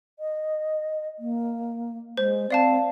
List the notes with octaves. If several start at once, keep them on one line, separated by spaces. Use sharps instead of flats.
D#5
A#3
G#3 C5
C4 D5 F5 A5